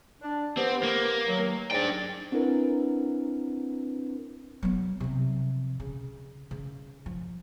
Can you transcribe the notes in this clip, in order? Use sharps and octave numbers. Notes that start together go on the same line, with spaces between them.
D4
B3 C4 G4
A#3
D#3 F#3
G#2 D4 D5 G5
C4 D4 E4 A#4 B4
F#3 B3
C3 F3
C#3
C#3
F3